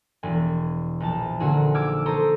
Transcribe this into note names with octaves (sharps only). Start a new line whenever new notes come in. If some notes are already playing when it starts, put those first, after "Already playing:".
E1 G#5
A#1 A5
A#2 D3 D#4 F#4 G#4
D6 E6 F6 G#6 D7
A4 C5 A#5 C#6 D#6